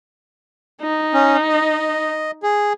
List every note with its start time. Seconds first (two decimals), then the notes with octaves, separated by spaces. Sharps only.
0.82 D#4
1.14 C#4
1.48 D#5
2.43 G#4